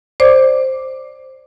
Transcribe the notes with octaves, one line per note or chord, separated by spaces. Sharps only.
C5 D5 D6